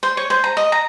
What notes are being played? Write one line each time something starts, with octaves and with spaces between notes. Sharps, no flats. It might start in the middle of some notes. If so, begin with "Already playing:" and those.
C5
C#5
C5
A#5
D#5
A#5